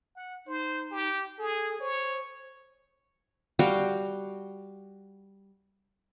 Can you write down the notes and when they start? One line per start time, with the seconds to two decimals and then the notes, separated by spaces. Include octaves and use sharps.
0.16 F#5
0.47 D#4 C5
0.91 G4
1.39 G#4 A4
1.80 C5 C#5
3.59 G3 F#4 F5 G5